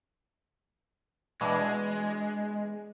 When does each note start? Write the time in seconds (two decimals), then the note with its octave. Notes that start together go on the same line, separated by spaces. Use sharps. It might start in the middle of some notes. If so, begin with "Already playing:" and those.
1.41 B2 E3 G#3 D4